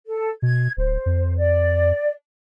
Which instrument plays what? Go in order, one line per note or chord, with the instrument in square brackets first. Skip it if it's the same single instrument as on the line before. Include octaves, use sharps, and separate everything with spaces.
[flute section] A4
[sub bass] B2 [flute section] G#6
[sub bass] D1 [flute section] C5
[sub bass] F2
[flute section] D5